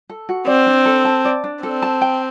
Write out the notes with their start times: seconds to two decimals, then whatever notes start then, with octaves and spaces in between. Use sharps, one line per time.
0.09 A4
0.29 F#4
0.47 C4 D5
0.67 D4
0.85 A4
1.05 A5
1.25 D5
1.44 D4
1.63 C4 A4
1.82 A5
2.01 G5